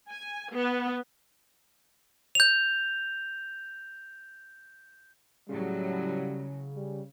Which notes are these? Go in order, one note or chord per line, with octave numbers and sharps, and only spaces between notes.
G#5
B3
G6 F7
A2 C#3 F#3 G3
G3